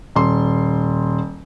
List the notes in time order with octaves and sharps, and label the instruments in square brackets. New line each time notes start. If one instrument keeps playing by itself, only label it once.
[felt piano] D#1 C6